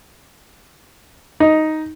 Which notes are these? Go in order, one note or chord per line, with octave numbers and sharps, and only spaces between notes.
D#4